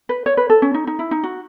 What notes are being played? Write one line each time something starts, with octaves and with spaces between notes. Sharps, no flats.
B4
C#5
B4
A4
C#4
D#4
D#4
E4
D#4
F#4